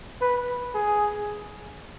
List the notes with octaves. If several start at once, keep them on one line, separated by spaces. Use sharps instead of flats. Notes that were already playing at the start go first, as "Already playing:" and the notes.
B4
G#4